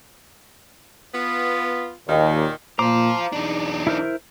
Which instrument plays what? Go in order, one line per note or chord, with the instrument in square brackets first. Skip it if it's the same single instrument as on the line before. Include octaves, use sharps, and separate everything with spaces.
[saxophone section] B3 F4
[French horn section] D#2 [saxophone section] A#2 D#3
[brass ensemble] A#2 [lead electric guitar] F4 C5 [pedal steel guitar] A#5 D6
[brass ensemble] B1 E2 [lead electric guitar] D4 D#4
[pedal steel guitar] E4 A#4 C5